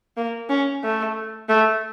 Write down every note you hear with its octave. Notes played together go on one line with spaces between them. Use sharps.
A#3
C#4
A3
A3